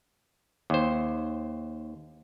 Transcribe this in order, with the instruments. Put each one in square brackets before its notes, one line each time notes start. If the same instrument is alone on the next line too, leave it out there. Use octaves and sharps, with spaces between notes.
[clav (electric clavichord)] D#2 C5